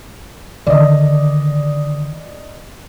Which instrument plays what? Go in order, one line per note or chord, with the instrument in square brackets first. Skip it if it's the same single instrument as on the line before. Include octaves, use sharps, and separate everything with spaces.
[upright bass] D3 D#3 [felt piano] D5 D#5